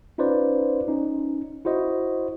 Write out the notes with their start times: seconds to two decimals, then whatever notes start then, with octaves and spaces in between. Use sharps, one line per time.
0.18 C#4 D#4 F4 B4 C5 D5
0.88 C#4 D#4
1.65 E4 F#4 C5 D#5